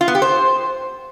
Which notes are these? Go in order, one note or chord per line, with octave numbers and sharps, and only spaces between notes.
F4
B3
G4
C5